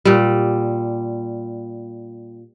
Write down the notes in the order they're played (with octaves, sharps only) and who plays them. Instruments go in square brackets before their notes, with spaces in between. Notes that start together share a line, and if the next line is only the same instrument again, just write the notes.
[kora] A#2 G3